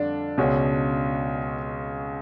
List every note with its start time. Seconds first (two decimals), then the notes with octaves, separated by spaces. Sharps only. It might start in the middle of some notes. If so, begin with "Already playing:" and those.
Already playing: F2 D3 G3 D4
0.38 C#2 B2 G#3 C#4 F#4